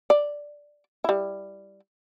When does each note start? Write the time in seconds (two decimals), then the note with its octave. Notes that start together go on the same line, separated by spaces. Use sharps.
0.10 D5
1.04 G3 E4